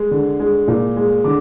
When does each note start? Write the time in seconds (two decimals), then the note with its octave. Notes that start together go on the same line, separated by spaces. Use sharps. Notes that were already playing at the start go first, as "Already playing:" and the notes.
Already playing: G#3
0.11 D3
0.39 G#3
0.68 A#2
0.96 G#3
1.24 D3 D6